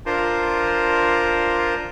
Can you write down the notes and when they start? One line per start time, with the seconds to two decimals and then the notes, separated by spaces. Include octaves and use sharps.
0.06 D4 F4 A#4 C5